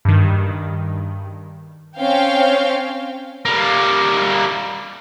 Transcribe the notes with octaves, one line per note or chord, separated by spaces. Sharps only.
G2 D#3
C4 C#4 F5 G5
G3 A#3